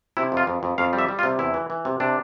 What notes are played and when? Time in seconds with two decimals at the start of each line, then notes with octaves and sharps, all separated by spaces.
0.17 C3 E4
0.32 F2 F4
0.47 F2
0.63 F2
0.78 F2 F5
0.93 G3
0.98 E5
1.09 G3
1.19 F4
1.23 C3
1.39 E2 E4
1.54 E3
1.70 E3
1.85 C3
2.00 C3 D4